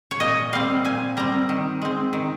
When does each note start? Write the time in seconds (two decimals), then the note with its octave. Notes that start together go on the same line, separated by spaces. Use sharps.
0.11 C#5
0.20 A#2 D#5
0.53 G3 C4 F5
0.85 A#2 G#5
1.17 G3 C4 A#5
1.49 D#3
1.82 G#3 C4
2.13 D#3